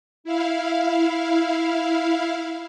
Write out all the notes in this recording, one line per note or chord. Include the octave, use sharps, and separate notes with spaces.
E4 F5